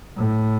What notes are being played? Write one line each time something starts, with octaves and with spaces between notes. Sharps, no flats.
A2